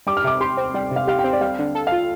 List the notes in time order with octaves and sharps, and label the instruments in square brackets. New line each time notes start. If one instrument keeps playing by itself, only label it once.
[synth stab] G3 [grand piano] D6
[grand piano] F6
[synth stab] C3 [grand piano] D6
[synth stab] G4 [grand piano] C6
[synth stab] C4
[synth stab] G3 [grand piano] G5
[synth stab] C3 [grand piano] F5
[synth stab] G4 [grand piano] F5
[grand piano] G5
[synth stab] C4
[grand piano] D5
[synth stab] G3 [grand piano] F5
[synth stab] D3
A4
[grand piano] F5
[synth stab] F4